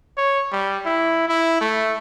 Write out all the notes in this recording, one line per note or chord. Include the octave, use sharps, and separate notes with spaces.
C#5
G3
E4
E4
A3